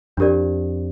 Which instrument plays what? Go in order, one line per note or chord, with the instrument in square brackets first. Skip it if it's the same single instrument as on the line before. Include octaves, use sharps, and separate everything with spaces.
[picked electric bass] F2 [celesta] D4 G4 A#4 D5